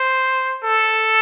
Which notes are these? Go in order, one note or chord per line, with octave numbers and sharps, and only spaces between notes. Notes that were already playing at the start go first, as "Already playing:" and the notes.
Already playing: C5
A4